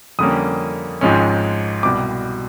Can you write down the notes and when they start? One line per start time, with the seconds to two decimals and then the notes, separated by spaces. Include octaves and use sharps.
0.19 F2 D3 G3 A#3 C#4 D#6
1.01 G#1 G#2 F3 G#3 C#4
1.83 C2 B2 G3 D6